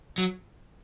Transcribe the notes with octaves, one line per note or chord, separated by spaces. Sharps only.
F#3